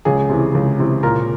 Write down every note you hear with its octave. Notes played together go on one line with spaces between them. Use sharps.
C#2 G#4
C3 E3
C#2
C3 E3
A#2 A#4